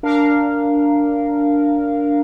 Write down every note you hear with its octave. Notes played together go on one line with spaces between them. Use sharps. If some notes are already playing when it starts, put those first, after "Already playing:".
D4 A#4 F5